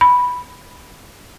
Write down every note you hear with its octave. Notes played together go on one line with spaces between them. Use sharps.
B5